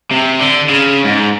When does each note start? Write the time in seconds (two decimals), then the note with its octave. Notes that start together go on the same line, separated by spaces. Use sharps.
0.11 C3
0.41 D3
0.70 C#3
1.04 G#2